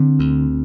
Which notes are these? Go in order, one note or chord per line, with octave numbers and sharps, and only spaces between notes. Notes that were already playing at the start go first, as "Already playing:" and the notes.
Already playing: D3 C4
D2